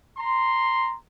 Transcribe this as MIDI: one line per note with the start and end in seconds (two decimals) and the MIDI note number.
0.18 0.96 82
0.18 0.96 84